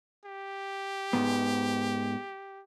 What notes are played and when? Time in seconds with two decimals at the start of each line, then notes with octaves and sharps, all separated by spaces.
0.25 G4
1.13 G#2 B3